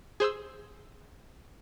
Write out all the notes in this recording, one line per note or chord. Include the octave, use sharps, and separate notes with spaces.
G#4 C5 C6 E6